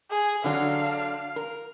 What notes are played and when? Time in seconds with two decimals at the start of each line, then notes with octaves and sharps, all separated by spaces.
0.10 G#4
0.44 D3 F#3 D4 F5
1.36 A#4